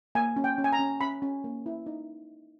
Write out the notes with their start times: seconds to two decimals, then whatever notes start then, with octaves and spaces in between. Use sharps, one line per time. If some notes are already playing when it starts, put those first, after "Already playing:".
0.15 A#3 G#5
0.36 C#4
0.44 G5
0.58 C#4
0.64 G#5
0.73 A#5
0.79 C#4
1.01 C#4 B5
1.22 C#4
1.44 A#3
1.66 E4
1.86 D#4